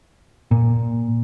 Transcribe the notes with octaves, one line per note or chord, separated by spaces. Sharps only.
A#2